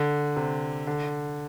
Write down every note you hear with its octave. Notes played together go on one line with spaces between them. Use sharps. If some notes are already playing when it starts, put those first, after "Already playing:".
Already playing: D3
C3
D3